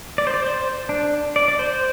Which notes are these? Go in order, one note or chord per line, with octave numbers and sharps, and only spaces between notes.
D5
C5
D5
C5
D4
D5
D5
C5